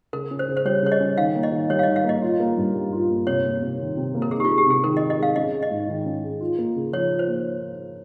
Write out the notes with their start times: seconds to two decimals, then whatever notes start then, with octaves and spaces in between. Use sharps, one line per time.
0.13 C#3 A#4
0.31 C#4
0.39 C5
0.48 C#3
0.57 C5
0.65 G3 C#5
0.83 C#3 C#5
0.92 D#5
1.00 C#4
1.17 D#3 F5
1.35 A#3
1.43 D#5
1.52 D#3
1.70 G3 C#5
1.79 F5
1.83 D#5
1.88 D#3
1.96 F5
2.04 A#3 D#5
2.22 F4
2.40 A#3
2.57 G2
2.75 G3
2.93 F4
3.10 A#3
3.27 C3 C#5
3.44 A#3
3.62 C3
3.79 D#3
3.97 C3
4.15 A#3
4.22 A#4
4.31 D#4 G#4
4.40 G4
4.45 F4
4.49 G#3
4.58 G4
4.66 C3 G#4
4.84 D#3 A#4
4.97 D#5
5.01 D#4
5.10 D#5
5.18 G#3 F5
5.36 C#4 D#5
5.53 G#3
5.63 D#5
5.71 G#2
5.88 D#3
6.06 C#4
6.24 G#3
6.40 F4
6.58 A#3
6.76 C#3
6.93 F3 C#5
7.10 F4
7.19 C5
7.28 A#3